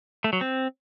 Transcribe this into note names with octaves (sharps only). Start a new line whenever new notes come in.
A3
F#3
C4